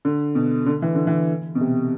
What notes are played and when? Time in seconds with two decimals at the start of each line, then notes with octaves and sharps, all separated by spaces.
0.05 D3
0.35 B2
0.66 D3
0.82 E3
0.95 D3
1.07 E3
1.55 B2
1.61 C3